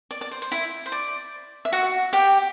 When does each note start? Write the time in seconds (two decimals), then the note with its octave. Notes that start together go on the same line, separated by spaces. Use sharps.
0.11 D5
0.21 D5
0.32 C5
0.42 C5
0.52 E4 E5
0.86 C5
0.92 D5
1.65 E5
1.72 F#4 F#5
2.13 G4 G5